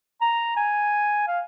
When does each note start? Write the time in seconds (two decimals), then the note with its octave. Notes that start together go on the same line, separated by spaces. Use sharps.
0.21 A#5
0.57 G#5
1.28 F5